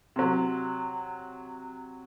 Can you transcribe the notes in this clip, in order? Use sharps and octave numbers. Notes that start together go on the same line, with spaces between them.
C3 F#3